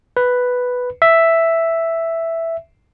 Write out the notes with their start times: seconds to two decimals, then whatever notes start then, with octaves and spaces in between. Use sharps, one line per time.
0.17 B4
1.02 E5